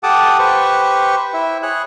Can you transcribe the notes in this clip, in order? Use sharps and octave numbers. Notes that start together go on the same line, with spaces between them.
G4 A4 F#5 A5 D6 D#6
G4 B4 C5 C#6
E4 E5
G#4 C#5 F#6